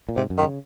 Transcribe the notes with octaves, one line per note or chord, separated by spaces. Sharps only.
A#2
G#2 C3
F#2
D#3
C#3